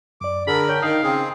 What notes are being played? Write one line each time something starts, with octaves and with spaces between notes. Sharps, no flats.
F#2 D5 D6
D3 G#4 A#4 B5
C#5 G5
D#3 F5 D#6
C#3 C4 G#4